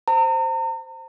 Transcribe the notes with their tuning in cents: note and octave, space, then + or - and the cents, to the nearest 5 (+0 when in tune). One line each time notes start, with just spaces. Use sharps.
C5 +0 A#5 -40